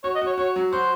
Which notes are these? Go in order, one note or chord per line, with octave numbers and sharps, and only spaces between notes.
F#4 C#5
D#5
F#4
C#5
F#4 C#5
F#3
F#4 C5